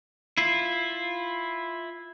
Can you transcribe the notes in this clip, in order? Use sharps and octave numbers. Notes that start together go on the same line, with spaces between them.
E4 F4